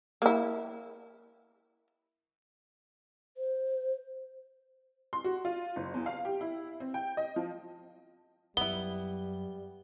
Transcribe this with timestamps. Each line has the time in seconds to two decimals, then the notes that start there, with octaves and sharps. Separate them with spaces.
0.22 A#3 E4
3.37 C5
5.13 C6
5.24 F#4
5.45 F4
5.76 F#1
5.94 E2
6.06 F5
6.25 G4
6.41 E4
6.80 C4
6.94 G5
7.17 D#5
7.36 F3
8.57 F#2 G3 B3 E4 G7